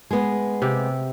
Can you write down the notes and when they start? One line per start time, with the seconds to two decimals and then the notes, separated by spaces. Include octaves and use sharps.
0.11 G#3 B3
0.62 C3 G4